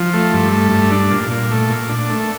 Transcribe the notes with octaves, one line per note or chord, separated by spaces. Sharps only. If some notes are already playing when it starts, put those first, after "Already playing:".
Already playing: F3
A3
G2
A3
G2
D4
A#2
A#2
A3
A#2
D4
A3